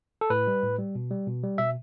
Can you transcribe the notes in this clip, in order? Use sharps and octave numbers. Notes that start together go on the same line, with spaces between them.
A4
A2 B4
G3
A2
G3
B2
G3
B2
G3
B2 E5